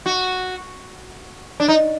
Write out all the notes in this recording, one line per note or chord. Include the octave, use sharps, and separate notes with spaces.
F#4
D4
D#4